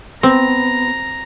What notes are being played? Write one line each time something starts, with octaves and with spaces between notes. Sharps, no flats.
B3 C4 A#5